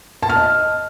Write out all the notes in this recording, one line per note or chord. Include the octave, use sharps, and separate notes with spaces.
A5
F6
D#5